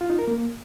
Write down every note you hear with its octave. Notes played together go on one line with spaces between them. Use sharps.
F4
D#4
A#4
A#3